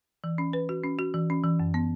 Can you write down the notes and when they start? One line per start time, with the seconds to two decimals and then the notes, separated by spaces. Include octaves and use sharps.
0.24 E3
0.38 C#4
0.53 B4
0.69 F#4
0.83 C#4
0.99 F#4
1.14 E3
1.30 C#4
1.44 E3
1.59 F#2
1.74 B3